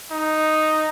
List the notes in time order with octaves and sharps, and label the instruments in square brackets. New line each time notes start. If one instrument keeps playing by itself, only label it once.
[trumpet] D#4